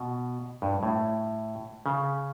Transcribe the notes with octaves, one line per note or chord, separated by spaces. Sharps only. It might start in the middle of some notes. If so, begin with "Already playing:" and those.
Already playing: B2
G2
A2
C#3